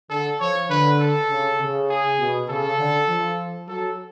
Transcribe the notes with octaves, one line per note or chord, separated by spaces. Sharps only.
D3 A4
F3 C#5
D3 B4
A4
C#3
C#3
G#4
B2
C#3 A4
D3
F3
F#3 A4